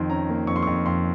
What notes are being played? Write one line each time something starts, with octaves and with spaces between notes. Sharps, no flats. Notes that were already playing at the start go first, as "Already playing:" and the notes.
Already playing: F2 D#3 C6
C#4 A#5
A#3
F2 C#6
C6
F2 C#6
F2 C6